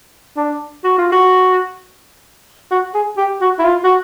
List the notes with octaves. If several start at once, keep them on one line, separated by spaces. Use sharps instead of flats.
D4
F#4
F4
F#4
F#4
G#4
G4
F#4
E4
F4
F#4